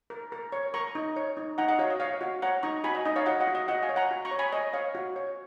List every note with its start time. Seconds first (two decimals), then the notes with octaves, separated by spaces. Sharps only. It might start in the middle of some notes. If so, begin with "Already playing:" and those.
0.10 A#4
0.32 A#4
0.52 C#5
0.74 A#4 A#5 C#6
0.95 D#4
1.16 C#5
1.37 D#4
1.58 D#4 F#5 A#5
1.69 D#5 F#5
1.79 F#4 C#5 F5
1.90 D#5
2.00 C#5 F5
2.21 F#4
2.42 C#5 F#5 A#5
2.63 D#4 A#5 C#6
2.84 F#4 G#5 B5
2.95 D#5
3.05 D#4 D#5
3.16 C#5 F5
3.26 F#4 D#5 F#5
3.40 D#5 F#5
3.47 F#4
3.55 D#5
3.68 F#4 D#5 F#5
3.83 F5 G#5
3.89 C#5
3.96 F#5 A#5
4.11 F#4
4.25 A#5 C#6
4.31 C#5
4.39 G#5 B5
4.53 C#5 D#5
4.73 C#5 F5
4.95 F#4
5.16 C#5